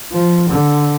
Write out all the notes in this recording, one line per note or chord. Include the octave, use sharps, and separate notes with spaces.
F3
D3